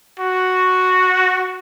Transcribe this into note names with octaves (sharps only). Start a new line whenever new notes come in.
F#4